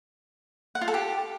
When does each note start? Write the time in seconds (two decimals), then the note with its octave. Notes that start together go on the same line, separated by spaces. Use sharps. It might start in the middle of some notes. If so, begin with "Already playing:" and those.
0.75 F#5
0.81 F4
0.88 A4
0.94 G4